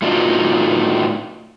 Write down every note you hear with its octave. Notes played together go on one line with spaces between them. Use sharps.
A2 A3 D4 D#4 F4 F#4